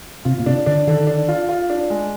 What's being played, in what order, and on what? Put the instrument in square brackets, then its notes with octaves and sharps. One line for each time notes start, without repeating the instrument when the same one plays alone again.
[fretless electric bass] C3 [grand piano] F4
[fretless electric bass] A#2
[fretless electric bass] C3 [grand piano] D4
[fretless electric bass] D3 [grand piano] D4
[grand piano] D3 [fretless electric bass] D#3
[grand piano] D4
F4
F4
D4
G#3